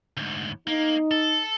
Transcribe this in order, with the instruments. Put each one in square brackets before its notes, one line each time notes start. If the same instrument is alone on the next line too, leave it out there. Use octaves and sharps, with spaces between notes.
[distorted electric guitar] D2 G#2
[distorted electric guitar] A#3 [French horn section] D#4
[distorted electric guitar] A4